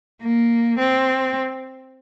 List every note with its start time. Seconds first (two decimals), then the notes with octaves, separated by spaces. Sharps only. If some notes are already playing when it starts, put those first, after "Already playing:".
0.23 A#3
0.79 C4